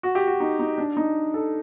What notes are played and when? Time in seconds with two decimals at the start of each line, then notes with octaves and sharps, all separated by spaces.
0.03 F#4
0.15 G4
0.28 F#4
0.40 D#4
0.59 D#4
0.78 D4
0.97 D#4
1.34 A4